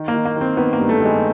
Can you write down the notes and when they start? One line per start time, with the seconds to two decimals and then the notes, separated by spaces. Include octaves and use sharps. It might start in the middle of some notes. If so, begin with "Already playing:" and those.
Already playing: D#3
0.08 A#3
0.14 D#3
0.25 A#3
0.36 D#3 C4
0.57 D#3 B3
0.73 A#3
0.79 G2
0.89 A3
1.00 D#3
1.05 G#3